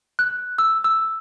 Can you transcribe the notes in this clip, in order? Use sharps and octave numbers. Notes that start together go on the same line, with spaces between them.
F#6
E6
E6